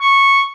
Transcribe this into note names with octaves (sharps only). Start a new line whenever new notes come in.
C#6